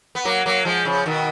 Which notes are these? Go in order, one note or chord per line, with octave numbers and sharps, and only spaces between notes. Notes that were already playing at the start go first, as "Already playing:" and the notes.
B3
F#3 A#3
F#3 A#3
F3 G#3
C#3 F3
B2 D#3